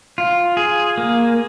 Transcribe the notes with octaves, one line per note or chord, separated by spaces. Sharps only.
F4
G#4
A#3